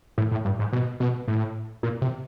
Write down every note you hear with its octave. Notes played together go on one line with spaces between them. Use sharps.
A2
A2
G2
G#2
B2
B2
A2
A#2
C3